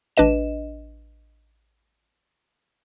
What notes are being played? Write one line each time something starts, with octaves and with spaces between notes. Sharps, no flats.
A1 D4 B4 D#5 E7